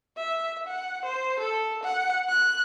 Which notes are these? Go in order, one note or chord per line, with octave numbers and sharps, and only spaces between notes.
E5
F#5
C5
A4
F#5
F#6